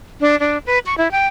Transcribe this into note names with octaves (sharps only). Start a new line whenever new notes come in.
D4
D4
B4
C#6
E4
G5